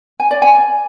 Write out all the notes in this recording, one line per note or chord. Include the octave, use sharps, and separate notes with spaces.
G#5
D5
G#5